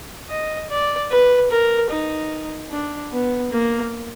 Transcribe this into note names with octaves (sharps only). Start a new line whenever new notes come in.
D#5
D5
B4
A#4
D#4
D4
B3
A#3